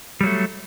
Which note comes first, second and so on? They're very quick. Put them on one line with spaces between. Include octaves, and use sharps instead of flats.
G3 F#3 A3